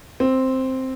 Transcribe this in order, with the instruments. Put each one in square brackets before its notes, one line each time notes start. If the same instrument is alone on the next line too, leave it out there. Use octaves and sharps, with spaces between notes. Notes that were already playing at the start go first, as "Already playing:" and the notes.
[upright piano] C4